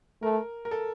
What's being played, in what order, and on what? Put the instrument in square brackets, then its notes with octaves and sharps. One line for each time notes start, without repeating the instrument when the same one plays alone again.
[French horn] A3 [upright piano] A#4
[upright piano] A#4
A4